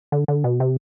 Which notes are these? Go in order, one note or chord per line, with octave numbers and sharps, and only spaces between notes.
D3
D3
B2
C3